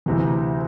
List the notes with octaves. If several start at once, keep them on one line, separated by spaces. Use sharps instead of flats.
D2 C3 E3